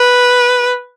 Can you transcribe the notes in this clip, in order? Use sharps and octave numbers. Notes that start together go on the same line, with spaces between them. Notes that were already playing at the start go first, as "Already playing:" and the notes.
Already playing: B4